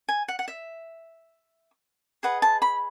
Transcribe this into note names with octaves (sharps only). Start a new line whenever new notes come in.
G#5
F#5
F#5
E5
G#4 B4 D#5 F#5
A5
B5